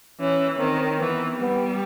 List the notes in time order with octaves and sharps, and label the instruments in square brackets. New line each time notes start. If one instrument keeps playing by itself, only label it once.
[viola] E3 [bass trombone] C#4
[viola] D#3 [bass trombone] C4
[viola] E3 [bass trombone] B3
[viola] G3 [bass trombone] B3